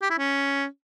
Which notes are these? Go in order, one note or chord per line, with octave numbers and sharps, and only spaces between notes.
G4
E4
C#4